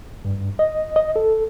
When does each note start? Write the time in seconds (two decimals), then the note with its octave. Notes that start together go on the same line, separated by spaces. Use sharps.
0.25 G2
0.59 D#5
0.96 D#5
1.16 A4